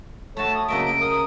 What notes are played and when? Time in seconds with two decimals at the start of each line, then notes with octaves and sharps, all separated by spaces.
0.37 A3 F#4 A4 C#5 A5
0.54 D#6
0.68 C#3 F#3 A#3 D#5 E5 D7
0.84 D7
1.01 A#4 D#6